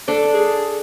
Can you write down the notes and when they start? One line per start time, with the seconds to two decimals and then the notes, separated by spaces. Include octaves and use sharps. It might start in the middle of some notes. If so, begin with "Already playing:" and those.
0.08 D4 A4 D5
0.34 G#4